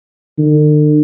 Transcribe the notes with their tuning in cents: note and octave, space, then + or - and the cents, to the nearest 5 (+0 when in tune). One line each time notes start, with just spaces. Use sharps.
D3 +45